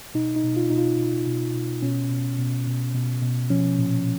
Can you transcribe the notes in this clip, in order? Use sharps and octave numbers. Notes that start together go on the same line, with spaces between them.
B2 D#4
D#4
B2
F4
B2 D#4
F4
B2
B2
B2
B2 C#4
B2
B2
B2
B2
B2
F3 C#4
A#2